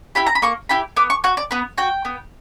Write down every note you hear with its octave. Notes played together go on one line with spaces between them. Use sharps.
E4 G4 B5
A#5
B5
A#3 C#6
E4 G4 B5
B3 D6
C#6
F#4 F#5
D5
B3 B4
F#4 G5
B3